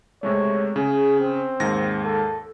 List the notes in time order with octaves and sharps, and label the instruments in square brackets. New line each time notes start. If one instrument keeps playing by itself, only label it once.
[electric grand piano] C3 G#3 A3 [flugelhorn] C#5
[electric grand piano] C#3 [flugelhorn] G#4
[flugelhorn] C4
[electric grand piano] D#2 G#2 A#6
[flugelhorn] A4